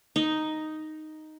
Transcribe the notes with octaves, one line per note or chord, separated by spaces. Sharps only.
D#4